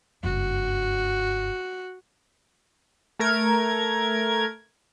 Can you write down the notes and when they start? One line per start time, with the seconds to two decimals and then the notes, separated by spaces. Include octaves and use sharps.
0.23 F#1 G2 F#4
3.19 A3 A#4 G#6